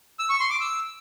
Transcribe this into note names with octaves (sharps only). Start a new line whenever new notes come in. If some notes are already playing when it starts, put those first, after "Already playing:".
E6
C#6
C6
D6
E6